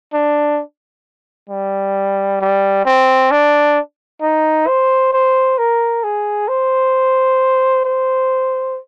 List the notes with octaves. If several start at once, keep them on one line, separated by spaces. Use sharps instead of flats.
D4
G3
G3
C4
D4
D#4
C5
C5
A#4
G#4
C5
C5